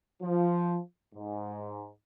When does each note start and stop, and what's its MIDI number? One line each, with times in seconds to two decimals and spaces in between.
0.22 0.79 53
1.15 1.87 44